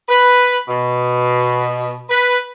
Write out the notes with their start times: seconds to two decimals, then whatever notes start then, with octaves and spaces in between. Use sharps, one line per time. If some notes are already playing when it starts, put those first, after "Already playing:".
0.09 B4
0.68 B2
2.09 B4